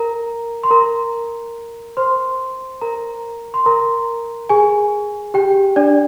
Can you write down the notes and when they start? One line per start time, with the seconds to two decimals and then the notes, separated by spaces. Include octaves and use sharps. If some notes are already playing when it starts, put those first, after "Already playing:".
Already playing: A#4 A#5
0.64 C6
0.70 A#4 A#5
1.97 C5 C6
2.81 A#4 A#5
3.54 C6
3.66 A#4 A#5
4.49 G#4 G#5
5.34 G4 G5
5.76 D4 D5